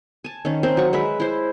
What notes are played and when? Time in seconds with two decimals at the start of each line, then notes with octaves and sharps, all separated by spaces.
0.24 G#5 A5
0.45 D#3 C#4
0.63 C4 A#4 C5
0.77 F#3 C#6
0.93 G#3 B4 E5
1.20 E4 C5